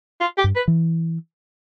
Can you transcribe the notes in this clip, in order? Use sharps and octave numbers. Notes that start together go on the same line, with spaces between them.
F4
G4
G2
B4
E3